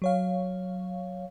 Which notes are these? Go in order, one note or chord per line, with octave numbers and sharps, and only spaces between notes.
F#3 C#5 F5